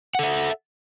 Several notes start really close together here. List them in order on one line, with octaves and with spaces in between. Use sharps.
F#5 A4 E5